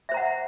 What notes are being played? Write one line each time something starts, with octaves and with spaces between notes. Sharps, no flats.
C5 E5 F#5 A#5